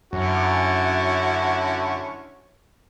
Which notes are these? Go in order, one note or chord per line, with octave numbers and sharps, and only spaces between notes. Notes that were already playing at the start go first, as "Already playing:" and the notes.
F#2 D3 C#4 E4 F#4